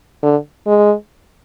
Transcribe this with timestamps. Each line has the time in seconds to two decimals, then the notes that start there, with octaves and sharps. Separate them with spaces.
0.23 D3
0.67 G#3